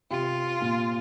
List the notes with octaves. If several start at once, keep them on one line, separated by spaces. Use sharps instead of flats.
C3 F4
A#2